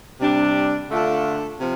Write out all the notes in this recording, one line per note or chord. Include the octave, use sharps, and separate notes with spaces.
C3 G3 D4 G4
D3 A3 D4 F4 A4
C3 F3